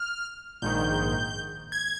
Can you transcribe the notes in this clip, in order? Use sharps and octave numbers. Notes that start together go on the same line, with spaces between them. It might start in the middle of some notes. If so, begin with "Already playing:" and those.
Already playing: F6
A#1 G#2 D#3 G6
G#6